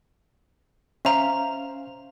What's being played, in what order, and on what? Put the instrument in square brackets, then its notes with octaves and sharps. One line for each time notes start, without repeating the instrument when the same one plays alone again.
[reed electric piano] C#4 C5 F5 [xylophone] E5 A#5